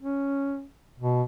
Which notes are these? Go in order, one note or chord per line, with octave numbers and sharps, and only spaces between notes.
C#4
B2